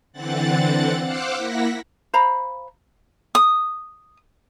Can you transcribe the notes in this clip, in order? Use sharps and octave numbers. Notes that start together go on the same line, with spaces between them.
D3 E3 C4 F#5 F#6 A6
C5 F5 F#5 D6 E6 F#6
A#3 E4 F#5 A#6 B6
C5 F5 A#5 B5
D#6